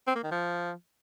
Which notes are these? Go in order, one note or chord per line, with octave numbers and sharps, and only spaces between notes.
C4
A#3
D#3
F3